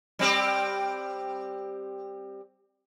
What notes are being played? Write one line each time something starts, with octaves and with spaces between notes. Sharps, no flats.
G3 C4 G4